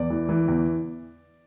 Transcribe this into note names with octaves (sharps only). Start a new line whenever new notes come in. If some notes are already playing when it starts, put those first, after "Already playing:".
Already playing: E2 D5
E3
E3
E2